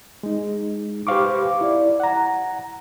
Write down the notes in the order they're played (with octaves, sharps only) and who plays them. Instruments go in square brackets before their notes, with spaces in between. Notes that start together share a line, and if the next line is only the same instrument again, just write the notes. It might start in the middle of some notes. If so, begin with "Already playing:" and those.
[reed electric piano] G#3 D#4
G4 B4 C5 F5 C#6 D6
E4 D5
F#5 A#5